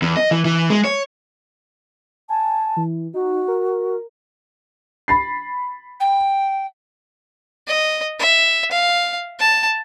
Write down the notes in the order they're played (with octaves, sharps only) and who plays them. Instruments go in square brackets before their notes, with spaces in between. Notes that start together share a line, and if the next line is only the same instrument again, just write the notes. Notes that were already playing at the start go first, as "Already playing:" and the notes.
[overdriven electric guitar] E2
D#5
E3
E3
G#3
C#5
[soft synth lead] G#5 [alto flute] A5
[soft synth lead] E3
[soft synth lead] D#4 [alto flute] F#4
[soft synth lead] A#4
[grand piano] B5 A6 C7
[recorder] G5
[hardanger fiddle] D#5
E5
F5
A5